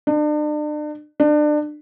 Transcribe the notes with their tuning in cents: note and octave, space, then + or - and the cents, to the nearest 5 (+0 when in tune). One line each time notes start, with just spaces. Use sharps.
D4 +40
D4 +30